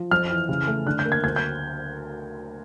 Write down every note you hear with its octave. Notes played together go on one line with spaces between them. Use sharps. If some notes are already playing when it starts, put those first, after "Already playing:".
Already playing: F3
F2 F6
E3
C#3
A3
D3 F#6
G6
A#3
G#6
D2 G#6
G6